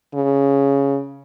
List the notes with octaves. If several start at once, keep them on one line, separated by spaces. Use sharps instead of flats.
C#3